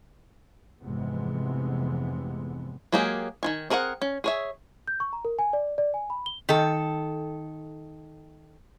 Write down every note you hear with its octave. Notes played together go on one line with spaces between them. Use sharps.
F1 G#2 C3 E3 G#3 B3
F#3 G#3 A#3 G4 G#4
D#3 F4 G#5
C4 G#4 A#4 D#5 F#5
C#4
G#4 C#5 E5
G6
C#6
A#5
A#4
G#5
D5
D5
G#5
B5
G7
D#3 A4